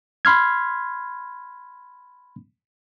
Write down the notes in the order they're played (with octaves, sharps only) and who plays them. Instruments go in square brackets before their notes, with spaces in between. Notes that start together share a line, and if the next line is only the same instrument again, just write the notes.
[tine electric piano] B5 C6 F6 G#6